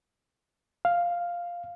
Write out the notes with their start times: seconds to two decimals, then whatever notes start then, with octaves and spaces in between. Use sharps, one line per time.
0.85 F5